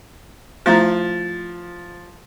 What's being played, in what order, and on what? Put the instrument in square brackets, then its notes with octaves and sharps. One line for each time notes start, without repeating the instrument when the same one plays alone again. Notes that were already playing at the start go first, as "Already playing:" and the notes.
[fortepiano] F3 [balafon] A3 E4 A#5